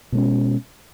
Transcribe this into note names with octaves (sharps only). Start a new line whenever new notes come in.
B2 G#3 C#4